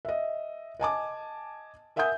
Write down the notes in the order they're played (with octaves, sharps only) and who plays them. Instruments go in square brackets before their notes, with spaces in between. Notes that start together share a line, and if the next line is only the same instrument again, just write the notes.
[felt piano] D#5 E5
D#5 G#5 A5 D6
A#4 E5 F#5 G#5 D#6 G6